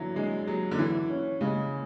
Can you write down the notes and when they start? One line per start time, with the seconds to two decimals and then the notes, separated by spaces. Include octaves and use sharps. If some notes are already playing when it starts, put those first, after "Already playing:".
Already playing: D3 E3 F#3 E4
0.16 G#3 D4
0.47 F#3 G#4
0.71 D3
0.78 E3 E4
1.10 C#4
1.41 C#3 G#3